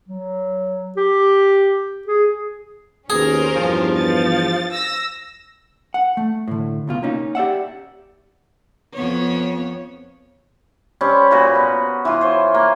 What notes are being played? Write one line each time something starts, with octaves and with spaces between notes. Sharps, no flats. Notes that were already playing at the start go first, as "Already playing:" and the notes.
F#3
G4
G#4
D#2 B2 C#4 G#4 A#4 C5
E2 G2 F3
A6
E6 A#6
F#5
A3
A2 D3
C#2 B2 F4
A#3 C#4 D#4
G4 D5 E5 F#5
F2 B3 C#5
G3 C4 C#4
A#2 F#4 B4 B5
B3
E3 F4
C5 C#5
A#3